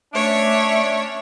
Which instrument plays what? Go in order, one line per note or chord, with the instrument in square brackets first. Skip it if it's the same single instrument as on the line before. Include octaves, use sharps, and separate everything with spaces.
[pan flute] A3 [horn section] C#4 D4 [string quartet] C#5 [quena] E5